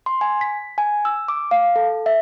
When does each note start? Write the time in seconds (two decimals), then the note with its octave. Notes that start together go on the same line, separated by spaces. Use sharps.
0.06 C6
0.21 G#5
0.41 B6
0.78 G#5
1.05 E6
1.28 D6
1.51 F5
1.76 A4
2.06 E5